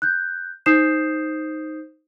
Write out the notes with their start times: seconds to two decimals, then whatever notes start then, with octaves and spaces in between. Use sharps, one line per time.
0.02 F#6 G6
0.66 D#4 C5 D#6 G6 C7 E7